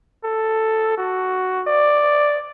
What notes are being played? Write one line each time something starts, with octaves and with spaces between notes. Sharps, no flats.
A4
F#4
D5